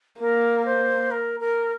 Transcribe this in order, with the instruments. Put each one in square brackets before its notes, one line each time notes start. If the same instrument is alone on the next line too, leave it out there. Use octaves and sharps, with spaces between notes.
[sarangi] A#3 [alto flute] A#4
[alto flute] C5
A#4
A#4